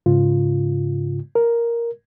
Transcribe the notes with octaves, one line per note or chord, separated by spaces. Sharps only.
G#2 C#3 F4
A#4